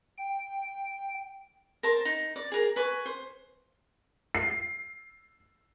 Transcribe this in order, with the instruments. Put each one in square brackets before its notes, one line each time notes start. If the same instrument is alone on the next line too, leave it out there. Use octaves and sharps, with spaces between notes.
[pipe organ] G5
[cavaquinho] A#4 C5 A5
D#4
D5
G#4 A#4
B4 G#5 C#6
C5
[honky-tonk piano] C7